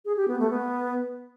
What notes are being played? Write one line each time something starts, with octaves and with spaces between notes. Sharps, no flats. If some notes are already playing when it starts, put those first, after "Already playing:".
G#4
G4
B3
A3
B3